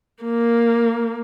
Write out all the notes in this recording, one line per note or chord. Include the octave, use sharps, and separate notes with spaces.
A#3